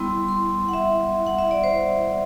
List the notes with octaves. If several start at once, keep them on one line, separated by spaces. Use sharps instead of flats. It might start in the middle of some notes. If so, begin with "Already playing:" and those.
Already playing: G3 B3 E4 C6
C6
F#5
E5
F#5
E5
D5
C5